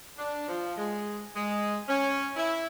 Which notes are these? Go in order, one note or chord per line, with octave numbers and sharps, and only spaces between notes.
D4
F3
G#3
G#3
C#4
E4